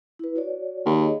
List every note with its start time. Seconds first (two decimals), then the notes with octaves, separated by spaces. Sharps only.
0.19 E4 B4
0.36 F#4 C#5 D5
0.86 D#2
0.99 G#4 C#5 D#5